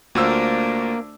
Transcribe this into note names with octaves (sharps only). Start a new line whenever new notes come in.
D2 A3 A#3 D4 F4 F#4 C5 E6